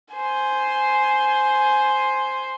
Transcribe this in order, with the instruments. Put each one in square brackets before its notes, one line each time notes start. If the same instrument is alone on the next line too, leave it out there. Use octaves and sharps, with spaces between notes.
[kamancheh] C5 G#5